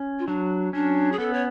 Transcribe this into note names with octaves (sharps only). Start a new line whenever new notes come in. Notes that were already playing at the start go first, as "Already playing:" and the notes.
Already playing: C#4
F4
F#3 D4
C#4 D4
G#4
B3 A4
C#5